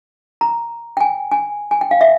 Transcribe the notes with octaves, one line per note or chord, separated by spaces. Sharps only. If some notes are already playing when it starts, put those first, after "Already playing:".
A#5
G5
G#5
G#5
G#5
G5
F5
E5